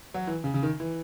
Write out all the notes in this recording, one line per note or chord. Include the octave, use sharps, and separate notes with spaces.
F#3
E3
C#3
C#3
D#3
E3